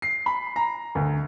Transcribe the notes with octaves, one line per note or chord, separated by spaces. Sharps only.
C7
B5
A#5
D2